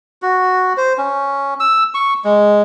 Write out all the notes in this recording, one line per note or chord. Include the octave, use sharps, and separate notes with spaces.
F#4
C5
C#4
E6
C#6
G#3